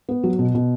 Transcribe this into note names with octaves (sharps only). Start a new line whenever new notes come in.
B3
F#3
B2
B2